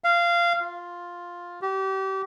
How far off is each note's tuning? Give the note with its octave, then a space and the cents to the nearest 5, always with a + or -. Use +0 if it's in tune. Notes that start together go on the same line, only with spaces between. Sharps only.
F5 -15
F4 +5
G4 -30